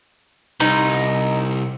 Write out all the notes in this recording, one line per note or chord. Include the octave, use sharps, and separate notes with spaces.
C2 D#4